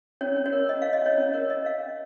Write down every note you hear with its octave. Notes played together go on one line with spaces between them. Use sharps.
C#4 C#5
C#4
C#5
A#4
C#4 D#5
C#5 F5
D#5
C#4 C#5
C#4
A#4 C#5
A#4 D#5
C#5 F5
C#4